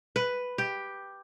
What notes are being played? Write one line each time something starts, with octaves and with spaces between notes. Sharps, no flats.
B4
G4